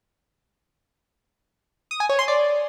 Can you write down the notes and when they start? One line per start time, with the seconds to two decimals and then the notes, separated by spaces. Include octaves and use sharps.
1.91 D#6
2.00 G#5
2.09 C#5
2.19 C6
2.28 D5